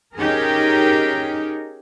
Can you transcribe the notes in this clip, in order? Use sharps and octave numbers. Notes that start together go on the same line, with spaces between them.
C#4 D#4 G4 G#4 A#4